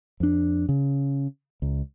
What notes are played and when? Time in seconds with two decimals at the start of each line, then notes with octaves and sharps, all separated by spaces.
0.20 F2 D4
0.69 C#3
1.62 C#2